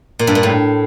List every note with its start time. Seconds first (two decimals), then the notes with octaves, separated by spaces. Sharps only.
0.19 A#2
0.27 G2
0.35 A#2
0.43 A2